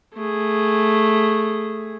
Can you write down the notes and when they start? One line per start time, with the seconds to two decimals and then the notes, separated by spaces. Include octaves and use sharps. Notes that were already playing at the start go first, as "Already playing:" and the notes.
0.14 A3 G#4